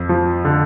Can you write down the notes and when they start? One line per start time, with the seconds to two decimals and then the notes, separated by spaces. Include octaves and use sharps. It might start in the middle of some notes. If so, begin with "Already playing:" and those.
Already playing: F2
0.09 F3
0.45 D3